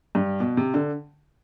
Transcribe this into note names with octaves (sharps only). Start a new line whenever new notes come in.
G2
B2
C3
D3